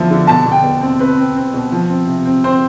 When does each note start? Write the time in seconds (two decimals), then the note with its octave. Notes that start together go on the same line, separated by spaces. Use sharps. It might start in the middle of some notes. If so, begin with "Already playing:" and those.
Already playing: D3 F3 B3 E4
0.10 D3
0.27 B2 A5
0.45 B2
0.52 G5
0.63 B2
0.81 C4
0.99 C4 B4
1.18 C4
1.36 C4
1.54 B2
1.72 F3
1.89 C4
2.07 C3
2.25 C4
2.44 C4 C5